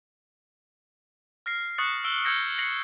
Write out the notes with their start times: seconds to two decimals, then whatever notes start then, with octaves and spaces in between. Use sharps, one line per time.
1.46 F6 A#6 C7
1.78 C#6 D#6 F#6 A6 C#7
2.04 E6 D7 G7
2.24 D#6 E6 G6 G#6 A#6 C#7
2.58 A#6 C7 C#7 F#7